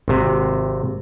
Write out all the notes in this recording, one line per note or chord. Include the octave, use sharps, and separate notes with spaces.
G#1 C3